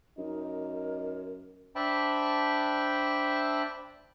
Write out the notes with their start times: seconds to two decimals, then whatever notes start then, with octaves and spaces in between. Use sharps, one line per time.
0.18 F#2 D#4 A#4
1.76 D4 C5 E5 G5 A5 B5